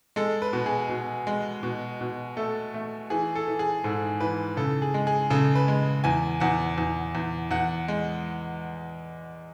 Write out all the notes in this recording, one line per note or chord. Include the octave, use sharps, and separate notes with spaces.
G#3 A4
B4
B2
G#4
B2
G#3
B2
B2
A3 A4
A3
E3 G#4
A4
E3
G#4
G#2 A4
E3 B4
C#3 A4
G#4
G#3
G#4
C#3 A4
B4
G#3
E2 G#5
E2 F#5
E2
E2
E2 F#5
G#3